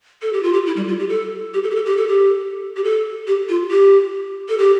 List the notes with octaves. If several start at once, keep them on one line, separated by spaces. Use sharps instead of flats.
A4
G4
F4
G4
E4
G3
F4
G4
A4
G4
A4
G4
A4
G4
A4
G4
G4
A4
G4
F4
G4
A4
G4